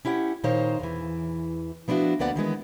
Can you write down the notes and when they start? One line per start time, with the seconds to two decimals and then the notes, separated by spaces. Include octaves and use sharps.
0.05 C#4 E4 G4 F#5
0.44 A#2 D#3 D#4 C5 C#5 F5
0.80 E2 E3
1.88 F3 B3 D4 E4 F#4
2.19 D2 A#3 B3 D5 F#5
2.35 D#3 E3 G#3 B3